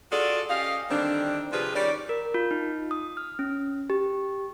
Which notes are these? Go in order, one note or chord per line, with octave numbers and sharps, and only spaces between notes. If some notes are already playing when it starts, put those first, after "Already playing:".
F4 F#4 G#4 A4 D5
C#4 G4 D#5 F5
D3 D#3 G3 C4 D4
C3 F3 D4 F4 G#4 B4
D#3 G3 C#4 D5
A#4
F4
D#4
D#6
F6
C#4
G4